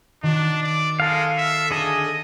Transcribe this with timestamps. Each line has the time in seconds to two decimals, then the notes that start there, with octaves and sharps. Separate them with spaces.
0.23 D#3 D4 F#4 C#5
0.63 D5
1.00 G#3 A4 F5
1.38 E5
1.71 D3 G#4 A4 D#5